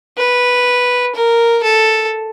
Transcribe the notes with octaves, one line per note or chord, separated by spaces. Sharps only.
B4
A#4
A4